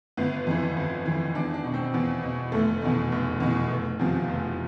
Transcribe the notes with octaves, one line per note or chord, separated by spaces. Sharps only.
G1 B3
F2 E3
G1
F2 E3
E2 D4
D4
B2
C4
E2 B3
B2
F1 A3
E2 B2
F1
E2 B2
F1
E2 C3 F3
F1